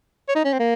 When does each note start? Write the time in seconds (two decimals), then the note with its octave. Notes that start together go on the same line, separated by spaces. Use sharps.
0.29 C#5
0.36 D#4
0.45 C#4
0.53 C4
0.60 A#3